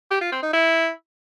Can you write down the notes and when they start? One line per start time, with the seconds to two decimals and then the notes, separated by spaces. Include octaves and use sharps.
0.11 G4
0.21 F4
0.32 C4
0.43 D#4
0.53 E4